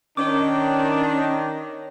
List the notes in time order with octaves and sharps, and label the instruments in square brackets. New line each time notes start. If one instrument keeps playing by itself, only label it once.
[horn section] D#3 [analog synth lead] C#4 [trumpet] D4 [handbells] C#5 D6